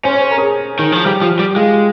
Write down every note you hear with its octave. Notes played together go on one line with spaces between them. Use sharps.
C#4 C5
C#5
C5
A#4
G#4
D#3
F3
G3 G4
F3
G3
G#3 F4